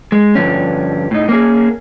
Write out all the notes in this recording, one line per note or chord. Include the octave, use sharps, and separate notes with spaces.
G#3
G2 D3 F3 C#4
A2 D#4
A#3 C#4 G#4